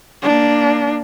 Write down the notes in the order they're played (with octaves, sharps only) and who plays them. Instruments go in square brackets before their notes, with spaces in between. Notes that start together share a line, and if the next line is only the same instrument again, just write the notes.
[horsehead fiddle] A#3 D4